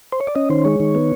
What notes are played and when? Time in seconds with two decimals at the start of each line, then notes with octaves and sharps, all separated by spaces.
0.12 C5
0.21 C#5
0.27 D5
0.36 C#4 D#5
0.50 D#3 C5
0.65 G#3 C#5
0.80 D#3
0.95 B3